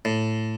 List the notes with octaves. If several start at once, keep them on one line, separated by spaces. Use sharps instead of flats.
A2